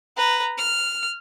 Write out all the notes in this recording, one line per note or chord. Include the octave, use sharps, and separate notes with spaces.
B4 A#5
F6